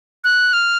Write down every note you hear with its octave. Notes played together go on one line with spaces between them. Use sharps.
F#6
F6